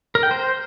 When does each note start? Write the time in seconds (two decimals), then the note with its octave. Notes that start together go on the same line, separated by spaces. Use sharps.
0.15 A#4
0.23 G5
0.31 C5